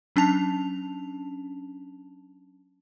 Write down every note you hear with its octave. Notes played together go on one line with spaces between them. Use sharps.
F#3 C#4 D4 A5 F7